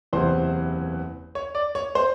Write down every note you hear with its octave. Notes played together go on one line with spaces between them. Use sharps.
F#1 E2 C3 E3 C5
C#5
D5
C#5
C5